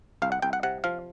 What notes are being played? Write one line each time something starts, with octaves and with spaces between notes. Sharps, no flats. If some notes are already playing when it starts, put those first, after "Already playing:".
C2 F5
F#5
C2 G5
F#5
C3 F#5
F3 F5